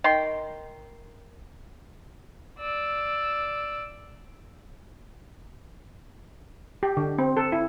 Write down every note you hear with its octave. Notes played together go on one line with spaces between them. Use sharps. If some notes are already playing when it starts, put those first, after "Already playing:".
D#3 G5 C6
D5 E6
G4
D3
C4
A4
E4